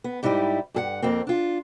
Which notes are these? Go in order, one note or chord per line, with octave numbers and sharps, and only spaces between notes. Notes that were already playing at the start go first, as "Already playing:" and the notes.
B3
G#2 G3 D#4 E4 F#4 G4
G2 G#4 F#5
F2 A#3 C4
D4 F4